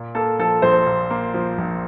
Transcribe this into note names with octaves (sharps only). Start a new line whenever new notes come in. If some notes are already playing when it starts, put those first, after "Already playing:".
Already playing: A#2
A#3 A4
F3 A4
A#1 C5
A#2
A#3
F3
A#1